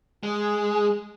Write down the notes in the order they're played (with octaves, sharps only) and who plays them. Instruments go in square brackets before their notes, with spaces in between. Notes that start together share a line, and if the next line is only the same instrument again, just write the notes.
[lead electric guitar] G#3 [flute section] G#4